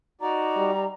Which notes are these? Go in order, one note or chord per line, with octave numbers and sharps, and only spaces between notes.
D#4 F#4 D5 A#5
G3